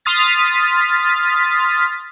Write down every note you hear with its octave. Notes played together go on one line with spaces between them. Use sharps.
C6 D#6 F6 A6 B6